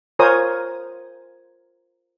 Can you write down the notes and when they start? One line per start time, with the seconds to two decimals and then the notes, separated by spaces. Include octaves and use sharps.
0.19 F4 A#4 C5 C#5 G#5 D#6